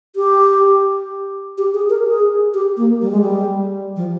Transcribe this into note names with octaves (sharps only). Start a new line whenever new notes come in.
G4
G4
G#4
A#4
G#4
G4
A#3
G3
G#3
G3
F3